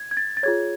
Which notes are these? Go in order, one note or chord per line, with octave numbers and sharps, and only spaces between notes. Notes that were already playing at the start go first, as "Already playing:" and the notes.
Already playing: G#6
G#6
A6
A6
F4 G#4 C#5 G#6